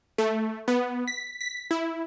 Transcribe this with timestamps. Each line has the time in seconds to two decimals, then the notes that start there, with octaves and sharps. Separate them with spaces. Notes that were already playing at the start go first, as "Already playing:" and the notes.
0.18 A3
0.68 B3
1.08 B6
1.41 B6
1.71 E4